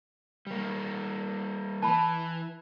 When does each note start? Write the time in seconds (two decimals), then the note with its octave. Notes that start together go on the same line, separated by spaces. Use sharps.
0.47 G3 A#3
1.82 E3 A5 B5